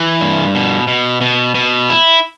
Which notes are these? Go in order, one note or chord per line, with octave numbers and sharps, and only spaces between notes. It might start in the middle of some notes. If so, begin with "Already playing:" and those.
Already playing: E3
G2
B2
B2
B2
B2
E4